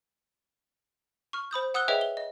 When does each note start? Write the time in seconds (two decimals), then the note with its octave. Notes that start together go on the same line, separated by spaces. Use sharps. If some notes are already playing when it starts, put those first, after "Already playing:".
1.33 C#6 F6
1.51 C5 B5 D#6 G6
1.74 F#5 D#6 E6 F#6 G7
1.88 G#4 B4 C#5 D#5 E5 G5
2.01 G7
2.17 D#5